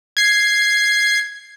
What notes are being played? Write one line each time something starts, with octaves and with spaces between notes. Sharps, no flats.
G#6 C7